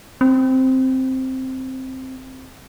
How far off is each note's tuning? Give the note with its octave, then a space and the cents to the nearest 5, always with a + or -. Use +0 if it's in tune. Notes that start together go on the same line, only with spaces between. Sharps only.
C4 +0